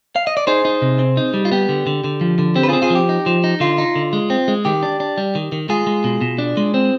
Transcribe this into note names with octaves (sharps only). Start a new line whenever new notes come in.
F5
D#5
D5
D#4 G#4 C5
D#4
C3
C4
D#4
G3
F4
B3 G4
D3
D3
D3
F3
D3
C4 G4
B4
C4 F4 G#4
F4 G#4
F3 G4
D#4
F3
D#4
D3 F4
D#4
D3
G#3
C4
G#3
D#3 G4
D4
D4
G3
D#3
D#3
G#3 F4 G#4
G#3
B2
B2
D4
G#3
C4